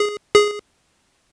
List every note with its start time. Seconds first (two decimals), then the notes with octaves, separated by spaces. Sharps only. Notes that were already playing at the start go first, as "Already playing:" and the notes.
Already playing: G#4
0.34 G#4